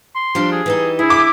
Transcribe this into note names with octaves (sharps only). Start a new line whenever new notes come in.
C6
F3 G3 D4
G#4
E3 G3 D#4
D2 E4 G#4
D6